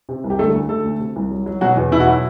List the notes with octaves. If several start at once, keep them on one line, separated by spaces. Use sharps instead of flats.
C3
C2
G4
D3 A3 A4
D2
D3 A3 A4
D2
C3
C2
F#3
F#3
B2 F#3 F#4
E2
B2 E4
F#4
F#3 E4